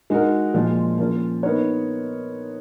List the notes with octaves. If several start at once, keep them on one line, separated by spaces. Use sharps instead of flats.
G#3 D#4 F#4 A#4
A#2 F3 G#3
F3 A#3 C#4 F4 A#4
B3 D#4 A#4 C#5